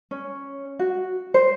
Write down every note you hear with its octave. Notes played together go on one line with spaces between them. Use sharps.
C#4
F#4
C5